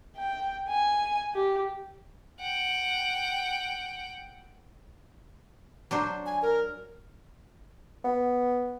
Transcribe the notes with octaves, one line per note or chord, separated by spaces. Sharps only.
G5
G#5
G4
F#5 G5
F#3 D4 C5
G#5
A#4
B3